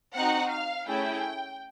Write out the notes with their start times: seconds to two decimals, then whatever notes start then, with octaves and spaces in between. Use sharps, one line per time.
0.14 C4 D#4 F#4 F#5
0.51 F5
0.87 A3 C#4 E4 G#4 G5